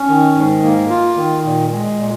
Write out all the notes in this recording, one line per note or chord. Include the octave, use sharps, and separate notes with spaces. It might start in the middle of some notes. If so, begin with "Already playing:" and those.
Already playing: C#4
D#3
G#2
A#3
F4
D#3
A#2
G#3
A#2